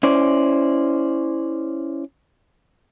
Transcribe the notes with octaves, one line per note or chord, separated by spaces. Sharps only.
C#4 E4 C5 D5